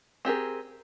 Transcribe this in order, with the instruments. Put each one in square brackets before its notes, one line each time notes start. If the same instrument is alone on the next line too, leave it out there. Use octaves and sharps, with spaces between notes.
[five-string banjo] C4 G4 G#4 A#4